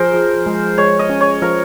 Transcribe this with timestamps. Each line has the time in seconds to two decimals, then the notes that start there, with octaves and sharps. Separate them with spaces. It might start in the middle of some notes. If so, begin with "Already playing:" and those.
Already playing: F3 G#4 A#4 C5
0.14 F3
0.46 G#3
0.78 G#3 C#5
0.99 D#5
1.10 C#4
1.21 C#5
1.42 F3 A#4